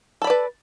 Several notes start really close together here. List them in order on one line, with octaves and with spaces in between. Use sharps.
A4 B5 D5 B4